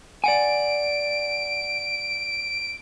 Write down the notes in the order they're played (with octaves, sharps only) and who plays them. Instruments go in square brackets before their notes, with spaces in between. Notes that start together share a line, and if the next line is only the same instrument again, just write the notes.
[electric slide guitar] D5 F#5 G#5 [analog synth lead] D7